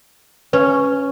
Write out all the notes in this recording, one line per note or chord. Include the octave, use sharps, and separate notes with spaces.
C#4 B4